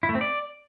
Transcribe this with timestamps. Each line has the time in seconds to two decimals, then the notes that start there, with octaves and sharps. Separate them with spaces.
0.03 E4
0.09 A3
0.15 C4
0.21 D5